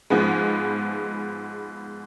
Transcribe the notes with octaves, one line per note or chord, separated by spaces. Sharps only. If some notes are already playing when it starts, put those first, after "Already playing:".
G#2 F3 G#3 B3